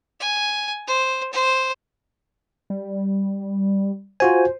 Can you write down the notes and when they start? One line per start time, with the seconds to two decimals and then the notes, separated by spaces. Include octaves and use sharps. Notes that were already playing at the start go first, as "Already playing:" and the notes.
0.20 G#5
0.87 C5
1.33 C5
2.70 G3
4.20 F4 F#4 C5 G#5